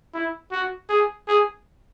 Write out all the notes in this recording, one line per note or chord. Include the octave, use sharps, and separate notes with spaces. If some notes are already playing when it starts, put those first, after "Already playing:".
E4
F#4
G#4
G#4